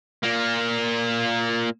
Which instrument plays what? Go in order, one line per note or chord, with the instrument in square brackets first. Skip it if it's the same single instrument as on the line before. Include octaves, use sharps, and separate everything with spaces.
[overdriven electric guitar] A#2 A#3